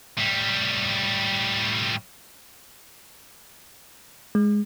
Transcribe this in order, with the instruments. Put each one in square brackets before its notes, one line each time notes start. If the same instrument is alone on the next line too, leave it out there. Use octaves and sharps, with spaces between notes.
[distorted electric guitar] A2 G3
[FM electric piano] G#3